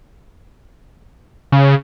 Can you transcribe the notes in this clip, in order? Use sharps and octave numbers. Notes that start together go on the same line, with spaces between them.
C#3